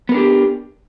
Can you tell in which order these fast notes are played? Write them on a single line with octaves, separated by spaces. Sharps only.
B3 A#4 D4 G4